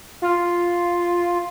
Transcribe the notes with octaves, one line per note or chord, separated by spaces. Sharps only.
F4